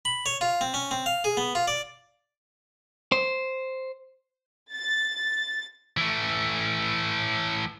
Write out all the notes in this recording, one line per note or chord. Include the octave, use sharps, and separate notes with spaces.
B5
C#5
F4
C4
C#4
C4
F5
G#4
B3
F4
D5
C5
A6
E3 A3